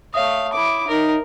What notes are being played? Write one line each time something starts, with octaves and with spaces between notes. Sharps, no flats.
A3 C#5 E5 F5 D#6
E4 D6
D#4 A#4